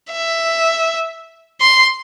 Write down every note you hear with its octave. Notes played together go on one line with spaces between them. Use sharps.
E5
C6